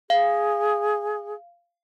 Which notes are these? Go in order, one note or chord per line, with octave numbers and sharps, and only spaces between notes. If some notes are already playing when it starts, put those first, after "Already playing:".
G#4 F5